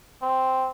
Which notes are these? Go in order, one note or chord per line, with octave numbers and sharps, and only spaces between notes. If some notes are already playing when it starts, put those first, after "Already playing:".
C4